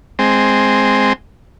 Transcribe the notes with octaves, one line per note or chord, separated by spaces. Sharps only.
G#3 C4